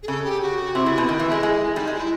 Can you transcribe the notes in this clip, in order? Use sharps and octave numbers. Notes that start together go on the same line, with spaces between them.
G#4
C#3 A4
G4
F#4
C3 E4
C#3
B2
D#3
E3
G#3
G#3
G3 D#4
G#3
E4